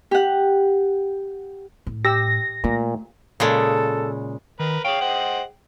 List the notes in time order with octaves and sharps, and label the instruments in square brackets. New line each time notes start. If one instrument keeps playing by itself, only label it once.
[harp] G4 F#5
[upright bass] A2
[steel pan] G4 E6 [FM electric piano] A#6
[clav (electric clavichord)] A#2 [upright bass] A3
[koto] A#2 C#3 G#3 [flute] A4
[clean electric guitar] D#3 [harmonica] A#4 B4
[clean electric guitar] G#4 G5 [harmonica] C#5 F5
[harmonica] C5 D#5 F#5